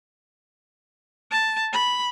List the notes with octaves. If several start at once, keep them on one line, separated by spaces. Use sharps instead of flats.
A5
B5